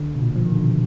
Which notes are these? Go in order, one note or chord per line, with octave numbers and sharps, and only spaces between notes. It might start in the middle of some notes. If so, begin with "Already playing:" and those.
Already playing: D3
B2
A#2
F3
D#3
D3
B2